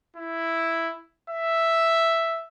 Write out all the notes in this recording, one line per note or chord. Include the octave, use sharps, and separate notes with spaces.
E4
E5